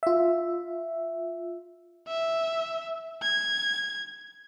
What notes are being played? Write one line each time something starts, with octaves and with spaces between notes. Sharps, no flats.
F4 E5
E5
G#6